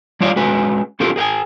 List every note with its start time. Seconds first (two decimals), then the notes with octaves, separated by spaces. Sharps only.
0.21 G3 E4 F4 C#5 D5 F5
0.36 G#3 C#4 F#4 B4 G#5
1.00 C#4 E4 F4 G4 A4 A#4
1.16 G#4 A#4 G5 G#5